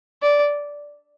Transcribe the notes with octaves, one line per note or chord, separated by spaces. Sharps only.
D5